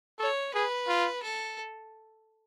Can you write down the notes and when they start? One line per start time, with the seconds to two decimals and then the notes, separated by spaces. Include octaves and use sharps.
0.19 A4 C#5
0.54 G#4 B4
0.88 F4
1.23 A4